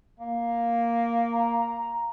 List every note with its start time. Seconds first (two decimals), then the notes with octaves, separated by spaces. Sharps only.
0.20 A#3
1.32 A#5